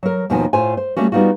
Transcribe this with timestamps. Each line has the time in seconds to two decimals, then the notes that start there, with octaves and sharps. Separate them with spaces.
0.03 F#3 A#4
0.30 D#2 B2 D#3 F3 F#4 G#5
0.53 A2 F4 C5 G#5
0.77 C5
0.96 G3 A3 A#3 C#4 F#4
1.12 G3 B3 D#4 F4 F#4